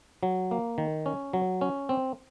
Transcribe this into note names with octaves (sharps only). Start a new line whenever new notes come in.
F#3
A#3
D#3
C#4
F#3
C#4
C4